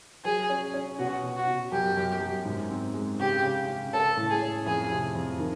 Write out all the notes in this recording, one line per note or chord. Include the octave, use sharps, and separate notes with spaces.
F#3 G#4
C#4
C#4
B2 F#4
B2
F#4
B2
F#2 G4
F#2
F#2
G#2
C4
G#3
C#3 G4
C#3
C#3
C#4 A4
A2
G#4
C#4
F2 G#4
C3
F2
D#3